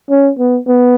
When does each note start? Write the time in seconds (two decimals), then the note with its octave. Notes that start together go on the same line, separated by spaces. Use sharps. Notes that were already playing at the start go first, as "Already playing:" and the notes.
0.10 C#4
0.39 B3
0.67 B3